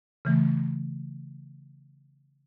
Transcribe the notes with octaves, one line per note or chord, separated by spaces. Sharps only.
C#3 E3 A3